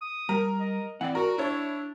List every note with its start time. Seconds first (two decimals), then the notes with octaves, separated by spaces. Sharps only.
0.01 D#6
0.29 G3 A#4
0.60 D#5
1.01 E3 C4 D5 F#5
1.15 F#4 A#4
1.38 D4 E4 C#5